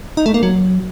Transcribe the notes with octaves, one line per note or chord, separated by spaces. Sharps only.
D#4
A3
A#3
F#3